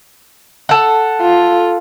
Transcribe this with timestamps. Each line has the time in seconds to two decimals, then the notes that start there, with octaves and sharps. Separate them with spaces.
0.69 A4 F#5
1.21 F4